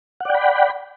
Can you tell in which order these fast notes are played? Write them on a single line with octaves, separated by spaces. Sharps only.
F#5 D5 G5 B5